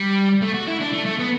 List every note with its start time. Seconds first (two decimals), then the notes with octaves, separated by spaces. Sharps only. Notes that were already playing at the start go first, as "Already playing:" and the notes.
Already playing: G3
0.42 A3
0.54 F#4
0.68 E4
0.81 D4
0.93 A3
1.06 A3
1.19 B3